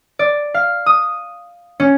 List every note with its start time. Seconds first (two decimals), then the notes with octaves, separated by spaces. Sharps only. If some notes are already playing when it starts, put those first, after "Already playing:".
0.19 D5
0.54 F5
0.86 D#6
1.80 C#4